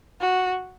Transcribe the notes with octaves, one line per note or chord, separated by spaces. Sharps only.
F#4